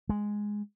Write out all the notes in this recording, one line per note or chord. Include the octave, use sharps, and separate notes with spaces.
G#3